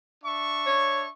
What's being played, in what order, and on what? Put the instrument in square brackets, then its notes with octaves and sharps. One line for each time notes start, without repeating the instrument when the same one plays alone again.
[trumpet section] D4 E5 C#6
[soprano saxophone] C#5